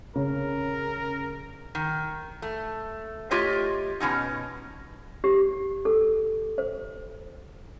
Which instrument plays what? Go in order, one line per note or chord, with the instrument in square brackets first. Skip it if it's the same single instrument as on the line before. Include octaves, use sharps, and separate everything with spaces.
[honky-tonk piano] C#3 [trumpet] A#4
[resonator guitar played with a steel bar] D#3
A3
A3 F4 G4 C#5 D#5
B2 E3 C#4 D#4
[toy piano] G4
A4
C5